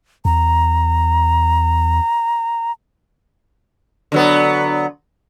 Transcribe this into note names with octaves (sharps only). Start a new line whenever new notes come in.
E2 A#5
D3 F#3 B3